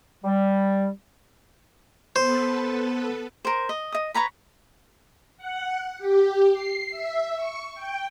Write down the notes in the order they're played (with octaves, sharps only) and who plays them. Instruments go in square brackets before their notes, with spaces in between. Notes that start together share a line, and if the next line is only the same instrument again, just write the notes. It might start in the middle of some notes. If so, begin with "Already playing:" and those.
[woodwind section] G3
[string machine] B3 A4 B4 [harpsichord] C5
[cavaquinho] A#4 C5
D#5
D#5 D#6
B4 C#5 A#5 B5
[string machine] F#5
G4
C7
E5
C#6
G5